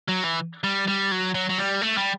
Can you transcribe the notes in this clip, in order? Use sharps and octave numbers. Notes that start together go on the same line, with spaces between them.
F#3
E3
G3
G3
F#3
F#3
F#3
G3
A3
G3